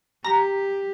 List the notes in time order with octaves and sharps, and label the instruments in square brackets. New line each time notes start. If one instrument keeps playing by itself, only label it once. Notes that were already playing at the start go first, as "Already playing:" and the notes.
[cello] G4 [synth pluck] A#5